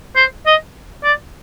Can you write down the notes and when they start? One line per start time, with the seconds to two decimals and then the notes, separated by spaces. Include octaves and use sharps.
0.16 C5
0.46 D#5
1.04 D5